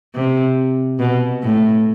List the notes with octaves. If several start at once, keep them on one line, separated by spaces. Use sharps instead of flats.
C3
B2
A2